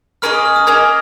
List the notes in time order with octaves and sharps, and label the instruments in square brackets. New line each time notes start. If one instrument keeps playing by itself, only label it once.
[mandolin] A#3 C#4 G#4 D#5 [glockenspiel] F6
[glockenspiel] D#6
F6
D#6
[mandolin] A#3 C#4 G#4 D#5 [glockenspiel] G#6